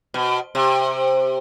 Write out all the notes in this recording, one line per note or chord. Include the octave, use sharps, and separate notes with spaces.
B2
C3